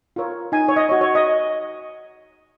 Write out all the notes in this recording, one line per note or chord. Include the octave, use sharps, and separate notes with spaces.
F4 A#4 C#5
D#4 G#5
C#5
D#5
F#4 C#5
C#5
D#5